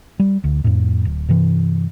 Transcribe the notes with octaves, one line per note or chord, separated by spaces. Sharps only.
G3
D2
F2 A2
D1
G2 C3 E3